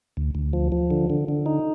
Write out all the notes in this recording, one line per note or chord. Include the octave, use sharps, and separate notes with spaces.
D2
D2
F3
F3
D3
D3
D3
D#4